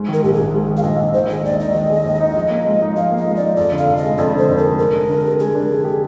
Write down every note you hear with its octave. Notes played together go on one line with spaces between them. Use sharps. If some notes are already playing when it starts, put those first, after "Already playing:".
Already playing: G#2
D#3
A#4
A#1 G4
A#1 G#4
G#2
D#3
F5
A#1 D#5
A#1
D#3 C5
G#3 D#5
D#2 D5
D#4 D#5
D#3
G#3
D#2
D#4
F3
A#3
G#2
D#4
F3 F5
A#3
D#5
G#2
D5
D#4
F2 D5
D3
F5
F1
D#5
G#3
F2 D5
D3 C5
F1
A#4
G#3
G#3 A#4
D4
D3
G4
G#3 G#4
D4
D3
G4